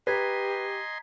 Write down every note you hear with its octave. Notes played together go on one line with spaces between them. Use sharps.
G4 B4 D#5 G#5 A#5 C6 G#6 B6